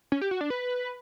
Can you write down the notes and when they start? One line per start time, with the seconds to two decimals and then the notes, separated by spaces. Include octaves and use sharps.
0.12 C#4
0.21 G4
0.31 F#4
0.41 D4
0.50 B4